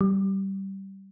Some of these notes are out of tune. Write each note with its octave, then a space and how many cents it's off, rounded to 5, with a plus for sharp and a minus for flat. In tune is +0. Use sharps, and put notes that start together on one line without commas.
G3 -15